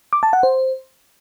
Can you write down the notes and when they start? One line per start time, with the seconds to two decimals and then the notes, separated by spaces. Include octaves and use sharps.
0.13 D6
0.23 A5
0.33 F#5
0.43 C5